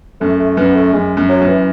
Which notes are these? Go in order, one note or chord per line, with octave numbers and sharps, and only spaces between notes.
F#2 A3
A3
F#2 B3
A3
F#2 G#3
F#2
F#3
F#2
E3